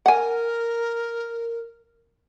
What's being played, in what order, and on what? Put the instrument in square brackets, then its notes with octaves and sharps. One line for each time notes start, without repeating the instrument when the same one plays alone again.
[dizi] A#4 [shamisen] F#5 G#5